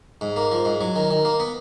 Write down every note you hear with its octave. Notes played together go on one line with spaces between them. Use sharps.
G#2
A#3
F3
G#2
F#3
D#3
D#3
A#3
B3